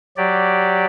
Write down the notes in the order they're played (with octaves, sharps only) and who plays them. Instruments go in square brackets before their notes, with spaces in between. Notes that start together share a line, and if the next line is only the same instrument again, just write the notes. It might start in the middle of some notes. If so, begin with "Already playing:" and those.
[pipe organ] F#3 G4 D5